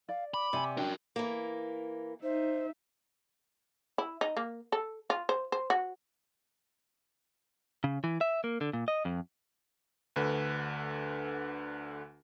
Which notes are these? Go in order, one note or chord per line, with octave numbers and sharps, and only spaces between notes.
D5 F5
B5 D6
C3 D5 G#5
D4 F#4 A#4 G5
E3 A#3
D#4 C5 E5
E4
D#4
A#3
A4
F4
C5
C5
F#4
C#3
E3
E5
A#3
D3
A#2
D#5
F2
D2 D3 B4